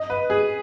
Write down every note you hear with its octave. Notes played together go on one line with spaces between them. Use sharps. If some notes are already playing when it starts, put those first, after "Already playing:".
Already playing: D#5
B4
G#4